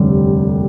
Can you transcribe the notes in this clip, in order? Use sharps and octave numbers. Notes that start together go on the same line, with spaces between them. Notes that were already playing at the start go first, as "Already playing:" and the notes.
Already playing: F1 D#2 D3 G3